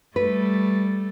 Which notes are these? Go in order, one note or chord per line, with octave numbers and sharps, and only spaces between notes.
G3 A3 B4